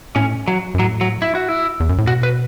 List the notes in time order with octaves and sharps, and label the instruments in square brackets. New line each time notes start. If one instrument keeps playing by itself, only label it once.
[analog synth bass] A2 [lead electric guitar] C#4
[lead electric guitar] F#3
[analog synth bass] F#2
[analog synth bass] A2 [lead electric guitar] F#3
[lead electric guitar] F#3
E4
F#4
E4
[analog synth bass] E2
F#2
A2
[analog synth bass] B2 [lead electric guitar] F#4
[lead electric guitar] B4